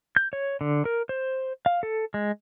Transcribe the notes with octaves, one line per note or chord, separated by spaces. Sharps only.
G6
C#5
D3
A#4
C5
F5
A4
G#3